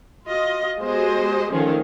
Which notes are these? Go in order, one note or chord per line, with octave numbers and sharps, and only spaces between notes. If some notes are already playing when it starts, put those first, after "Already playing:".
F4 F#4 D#5
G#3 B3 F#4 G4 C5 D#5
D#3 F3 A3 C#4 F4 G#4